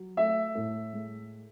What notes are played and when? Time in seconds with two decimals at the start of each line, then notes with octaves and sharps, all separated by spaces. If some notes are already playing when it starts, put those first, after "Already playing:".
Already playing: F#3
0.17 A3 E5
0.55 A2
0.93 G#3